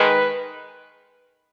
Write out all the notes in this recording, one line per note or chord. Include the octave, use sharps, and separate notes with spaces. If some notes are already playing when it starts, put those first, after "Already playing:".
Already playing: D#3 G#3 B4